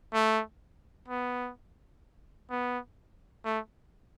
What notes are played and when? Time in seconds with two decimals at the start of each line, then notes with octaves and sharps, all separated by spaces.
0.13 A3
1.08 B3
2.50 B3
3.45 A3